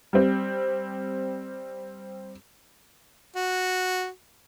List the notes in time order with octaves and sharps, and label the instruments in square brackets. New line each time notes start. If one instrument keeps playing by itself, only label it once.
[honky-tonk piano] G3 C4
[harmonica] F#4